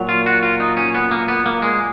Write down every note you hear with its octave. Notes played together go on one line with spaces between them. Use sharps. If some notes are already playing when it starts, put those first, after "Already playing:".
Already playing: A#2 F#3
F4
F#4
F4
D#4
C#4
B3
A#3
B3
A#3
G#3